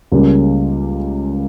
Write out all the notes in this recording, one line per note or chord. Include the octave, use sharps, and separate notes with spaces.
C#2 C#3 G3 A#3